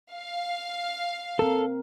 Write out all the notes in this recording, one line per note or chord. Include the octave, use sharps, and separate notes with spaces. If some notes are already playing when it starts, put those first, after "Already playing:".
F5
C4 A4 A#4